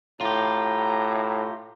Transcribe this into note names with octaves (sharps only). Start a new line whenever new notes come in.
A2 F4 G4 A#5